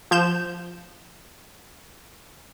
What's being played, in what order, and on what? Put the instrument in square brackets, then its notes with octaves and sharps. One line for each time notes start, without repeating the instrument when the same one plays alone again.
[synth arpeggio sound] F3 G6 E7